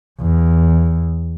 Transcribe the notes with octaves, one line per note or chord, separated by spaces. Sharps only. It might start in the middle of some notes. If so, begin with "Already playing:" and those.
E2